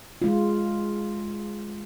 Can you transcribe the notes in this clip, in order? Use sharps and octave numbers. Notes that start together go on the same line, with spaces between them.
G#3 F4